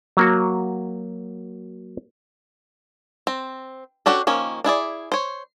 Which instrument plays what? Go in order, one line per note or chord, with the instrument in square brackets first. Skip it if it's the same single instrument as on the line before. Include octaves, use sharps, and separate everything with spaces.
[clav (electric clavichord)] F#3 A#3 F#4
[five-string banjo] C4
C#4 D4 F#4 G4 A4
D#3 F3 A#3 C#4
D4 E4 G#4 D5
C5 C#5